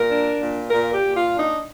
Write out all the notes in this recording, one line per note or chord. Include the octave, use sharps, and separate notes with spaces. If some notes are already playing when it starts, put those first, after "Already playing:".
Already playing: A#2 A#4
D4
A#2
A#2 A#4
G4
A#2
F4
D4
D#4